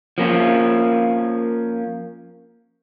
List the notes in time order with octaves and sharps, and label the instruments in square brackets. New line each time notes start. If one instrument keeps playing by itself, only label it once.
[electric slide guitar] F3 A#3 C#4